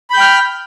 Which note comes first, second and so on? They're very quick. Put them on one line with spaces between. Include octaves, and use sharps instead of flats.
B5 G6 G5 F6